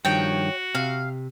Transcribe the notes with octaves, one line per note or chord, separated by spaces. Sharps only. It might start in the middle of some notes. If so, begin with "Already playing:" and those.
G2 D#3 F3 F#4 C#5 G5
C3 F5